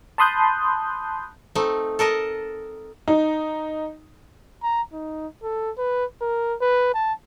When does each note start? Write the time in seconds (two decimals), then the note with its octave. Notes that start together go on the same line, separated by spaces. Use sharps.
0.18 A5 B5 C6 D#6 F#6 G6
1.55 A3 C4 D#4
1.99 A4 A#4 D#5 A5
3.08 D#4
4.63 A#5
4.93 D#4
5.43 A4
5.78 B4
6.22 A#4
6.61 B4
6.94 A5